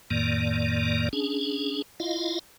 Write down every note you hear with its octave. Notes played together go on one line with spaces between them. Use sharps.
F2 A2 D#3 A#3 D5
C#4 D4 G#4
E4 F4 D#5 F5